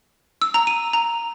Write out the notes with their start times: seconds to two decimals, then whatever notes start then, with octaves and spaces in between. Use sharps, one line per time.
0.42 E6
0.54 A#5
0.67 D#7
0.93 A#5